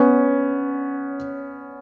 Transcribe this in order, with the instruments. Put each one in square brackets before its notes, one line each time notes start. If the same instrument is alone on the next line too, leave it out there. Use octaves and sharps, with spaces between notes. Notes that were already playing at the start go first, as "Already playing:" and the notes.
Already playing: [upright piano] B3 C#4